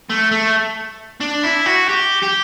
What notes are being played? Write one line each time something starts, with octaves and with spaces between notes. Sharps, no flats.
A3
A3
D4
E4
F#4
G4
G4